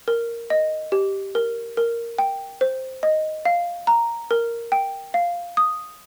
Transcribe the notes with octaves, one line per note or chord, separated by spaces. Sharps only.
A#4
D#5
G4
A#4
A#4
G5
C5
D#5
F5
A#5
A#4
G5
F5
D#6